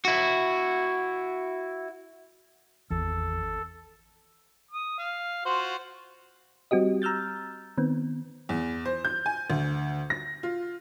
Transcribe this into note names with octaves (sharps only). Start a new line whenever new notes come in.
E4 F#4
G#1 E2 A4
D#6
F5
F4 F#4 C5
G3 C4 F#4 G4 D#5
A#5 E6 F6 G6 A6
D#3 B3 C4
E2
C5
G6
G#5
D2
A#6
F4